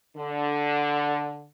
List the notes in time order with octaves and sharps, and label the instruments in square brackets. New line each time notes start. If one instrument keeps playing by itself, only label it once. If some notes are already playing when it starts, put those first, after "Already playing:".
[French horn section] D3